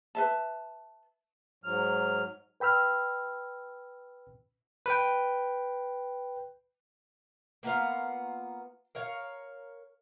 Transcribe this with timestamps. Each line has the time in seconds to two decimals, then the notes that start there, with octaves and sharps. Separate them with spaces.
0.15 B4 E5 A5
1.64 G#2 F#3 F6
2.60 B4 G5 B5 E6 F6
4.86 B4 G5
7.63 A#3 B3 F4 F5
8.95 A#4 C#5 F5